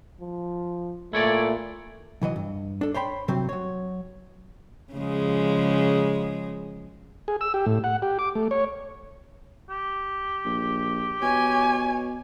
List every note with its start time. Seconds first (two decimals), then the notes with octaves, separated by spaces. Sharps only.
0.21 F3
1.13 A#2 A3 E4 C#5 D5
2.21 C2 E3 F#3 D#5
2.36 G2
2.81 D4 A4
2.94 C5 C#5 G5 B5 C6
3.28 G2 C3 F#3 C4 C5
3.49 F#3 C#5
4.93 C#3 F3 G#3
7.28 G#4
7.41 E6
7.54 G4
7.66 A2
7.84 F#5
8.02 G4
8.19 D6
8.35 A3
8.51 C#5
9.70 G4
10.46 A#1
11.22 B2 C#5 G#5